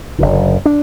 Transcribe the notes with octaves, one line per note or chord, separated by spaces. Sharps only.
F#1 F#2 D3
D4